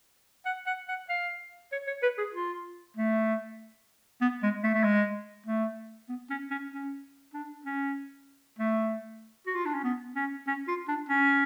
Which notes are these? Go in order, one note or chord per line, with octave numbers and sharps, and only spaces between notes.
F#5
F#5
F#5
F5
C#5
C#5
B4
G#4
F4
A3
B3
G#3
A3
A3
G#3
A3
B3
C#4
C#4
C#4
D4
C#4
A3
F#4
F4
D4
C#4
B3
C#4
C#4
F4
D4
C#4